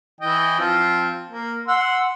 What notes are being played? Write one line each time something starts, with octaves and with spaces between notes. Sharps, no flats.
E3 D#5 G5
F3 C4 F4
A#3
F#5 C6 E6